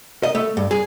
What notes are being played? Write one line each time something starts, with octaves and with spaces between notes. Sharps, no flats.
D#5
A3
G2
G#4